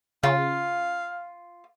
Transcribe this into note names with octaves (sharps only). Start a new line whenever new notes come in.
C#3 F4 F5